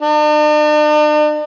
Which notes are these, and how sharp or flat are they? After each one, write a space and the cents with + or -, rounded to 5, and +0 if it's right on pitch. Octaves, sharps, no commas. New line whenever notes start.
D4 +45